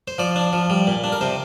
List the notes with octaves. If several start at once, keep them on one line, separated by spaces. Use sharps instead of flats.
C5
F3 D5
D4
F3
G3
A#2
D4
A#4
C3 C5